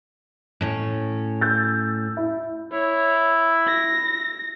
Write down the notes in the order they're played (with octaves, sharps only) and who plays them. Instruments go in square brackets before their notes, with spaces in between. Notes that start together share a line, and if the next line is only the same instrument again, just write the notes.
[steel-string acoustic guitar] A2 C#4
[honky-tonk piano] E6 G6 A6
E4
[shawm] E4 [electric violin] C#5
[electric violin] A#6